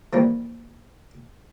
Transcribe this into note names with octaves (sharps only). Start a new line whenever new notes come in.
E3 F3 G3 A#3